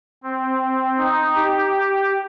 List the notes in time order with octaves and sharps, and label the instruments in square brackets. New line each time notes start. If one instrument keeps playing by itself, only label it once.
[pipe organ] C4
D#4
G4